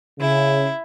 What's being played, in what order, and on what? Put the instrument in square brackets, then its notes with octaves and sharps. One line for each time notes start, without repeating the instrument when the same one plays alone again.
[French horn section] C#3 [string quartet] E4